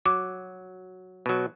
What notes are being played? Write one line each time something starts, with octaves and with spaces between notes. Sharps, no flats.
F#3 D6
B2 F#3